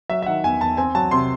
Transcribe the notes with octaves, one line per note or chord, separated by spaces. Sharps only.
F#3 E5
E5
D#3 F#5
E2 G#5
E2 A5
C4 G#5
F#3 A5
C3 C6